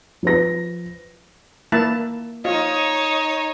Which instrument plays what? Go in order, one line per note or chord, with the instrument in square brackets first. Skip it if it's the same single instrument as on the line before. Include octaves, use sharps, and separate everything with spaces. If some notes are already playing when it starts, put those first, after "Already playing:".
[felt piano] F3 B4 A#6
[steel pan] A#3 E4 A5
[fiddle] D#4 C#5 [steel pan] F4 [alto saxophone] D#5